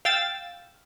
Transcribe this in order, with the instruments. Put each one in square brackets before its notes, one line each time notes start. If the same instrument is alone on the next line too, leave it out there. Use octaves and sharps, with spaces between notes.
[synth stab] F5 G5 E6 A6